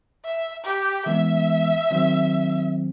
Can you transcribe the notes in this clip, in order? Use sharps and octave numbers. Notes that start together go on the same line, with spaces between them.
E5
G4
E3 G#3 B3 E5
D#3 F#3 C4